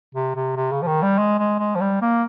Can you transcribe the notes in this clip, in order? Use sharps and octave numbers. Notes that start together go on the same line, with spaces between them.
C3
C3
C3
C#3
F3
D#3
G3
G#3
G#3
G#3
F3
G3
A#3